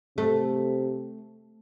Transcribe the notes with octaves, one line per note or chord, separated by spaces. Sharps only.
C3 A3